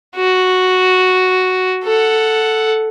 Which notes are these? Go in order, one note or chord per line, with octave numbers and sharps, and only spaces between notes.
F#4
A4 F#5